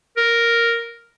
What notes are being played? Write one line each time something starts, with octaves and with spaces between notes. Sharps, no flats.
A#4